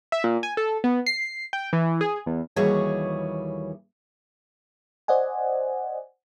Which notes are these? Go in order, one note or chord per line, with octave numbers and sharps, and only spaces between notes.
E5
A#2
G#5
A4
B3
C7
G5
E3
G#4
E2
D#2 E3 G3 F#4 G#4 C#5
C5 D5 D#5 F#5 G#5